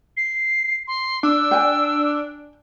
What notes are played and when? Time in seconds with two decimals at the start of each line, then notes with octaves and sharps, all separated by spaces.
0.17 C7
0.87 C6
1.23 D4 E6
1.51 G5 G#5